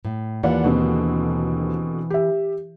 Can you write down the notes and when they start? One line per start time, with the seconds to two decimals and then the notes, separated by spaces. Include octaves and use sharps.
0.05 A2
0.43 D#2 E3 F4 D5 F#5
0.64 D#2 B2 D3 C4
2.10 G4 E5